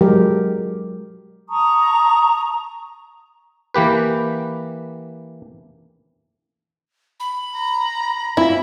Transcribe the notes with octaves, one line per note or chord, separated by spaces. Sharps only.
F#3 G#3 G4 A#4
A5 A#5 C#6 D#6
E3 A#3 G4 B4
B5
A#5
C4 E4 F4 B5